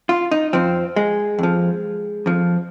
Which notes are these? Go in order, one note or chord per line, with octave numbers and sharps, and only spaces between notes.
F4
D#4
F2 F3 C4
G#3
F2 F3
F2 F3